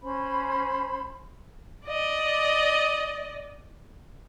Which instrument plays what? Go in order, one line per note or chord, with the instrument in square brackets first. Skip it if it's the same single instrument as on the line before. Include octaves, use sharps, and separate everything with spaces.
[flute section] C#4 C5 B5
[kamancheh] D5 D#5